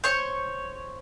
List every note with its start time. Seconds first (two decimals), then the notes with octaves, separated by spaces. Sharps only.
0.04 C5 C#5 C#6